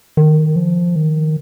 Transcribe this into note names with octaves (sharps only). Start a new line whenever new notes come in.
D#3
F3
D#3